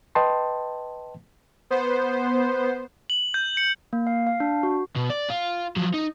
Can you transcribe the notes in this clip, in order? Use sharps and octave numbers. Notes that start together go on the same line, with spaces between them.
B4 D#5 G5 A5 C6
B3 C5
F#7
G6
C#7
A#3
F5
F5
D4
F#4
B2
D5
F4
F3 F#3
D#4